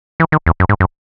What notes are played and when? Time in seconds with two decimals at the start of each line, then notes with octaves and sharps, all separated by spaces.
0.20 E3
0.32 D#3
0.46 E2
0.60 F#2
0.69 G#2
0.80 F#2